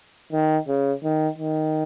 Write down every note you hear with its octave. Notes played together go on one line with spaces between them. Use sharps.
D#3
C#3
D#3
D#3